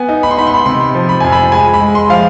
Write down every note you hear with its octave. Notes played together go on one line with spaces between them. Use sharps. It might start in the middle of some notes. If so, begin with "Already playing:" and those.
Already playing: B3 G#5
D#4
B5
C6
D#4 B5
C6
B5
C3 C6
F3
B5
F2 G#5
B5
G#3 G#5
B5
G#3
C6
F3 F5